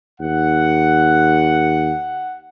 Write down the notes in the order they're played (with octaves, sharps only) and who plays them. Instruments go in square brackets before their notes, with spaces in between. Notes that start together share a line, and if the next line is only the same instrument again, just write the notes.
[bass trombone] D#2 [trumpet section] F#5